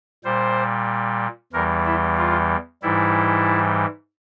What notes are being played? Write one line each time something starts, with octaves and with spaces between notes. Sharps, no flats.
A#2 G3 C5
E2 E3 G3 A#4
E4
F4
G#2 E3 G3 E4